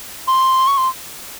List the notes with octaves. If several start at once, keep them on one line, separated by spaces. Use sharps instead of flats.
C6
C#6
C6